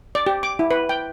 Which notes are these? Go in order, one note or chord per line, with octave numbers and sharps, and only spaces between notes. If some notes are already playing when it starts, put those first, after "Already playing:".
D5
G4
D6
E4
B4
G5